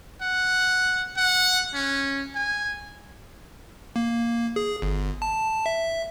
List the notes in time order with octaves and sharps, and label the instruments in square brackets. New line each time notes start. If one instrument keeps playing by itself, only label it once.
[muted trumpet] F#5
F#5
C#4
G#5
[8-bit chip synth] A#3
G#4
G1
A5
E5